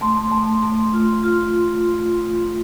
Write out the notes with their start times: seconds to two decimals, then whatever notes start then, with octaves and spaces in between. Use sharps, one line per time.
0.01 A3 C6
0.31 A3
0.63 A3
0.93 F4
1.24 F4